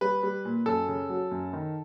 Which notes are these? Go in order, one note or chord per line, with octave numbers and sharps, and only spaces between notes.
G3 B4
G3
A#2
F#2 A4
C#3
F#3
F#2
D#3